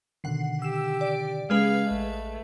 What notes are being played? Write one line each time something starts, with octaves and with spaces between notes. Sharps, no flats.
B2 D3 D#3 F#5 C7
G4 E6 E7
D5 D7
C#3 G#3 C#4 G#4 B4 F5 F6
A1 A3 D#5